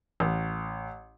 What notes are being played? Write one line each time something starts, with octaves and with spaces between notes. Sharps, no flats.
A1